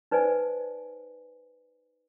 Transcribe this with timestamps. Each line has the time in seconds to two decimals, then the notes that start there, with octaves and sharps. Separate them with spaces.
0.11 D#4 B4 C5 D5 G#5